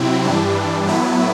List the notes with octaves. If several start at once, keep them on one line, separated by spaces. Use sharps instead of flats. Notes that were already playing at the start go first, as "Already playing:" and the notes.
Already playing: C3 F#3 C4 E4
G2 E3 G3 D4
A2 F#3 B3 E4